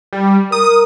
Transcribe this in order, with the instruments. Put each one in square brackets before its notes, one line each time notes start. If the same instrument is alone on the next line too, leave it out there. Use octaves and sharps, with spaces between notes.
[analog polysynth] G3
[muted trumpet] A#4 [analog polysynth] D#6